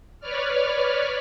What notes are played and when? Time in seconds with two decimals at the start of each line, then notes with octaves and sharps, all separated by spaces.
0.20 B4 C#5 D5 F6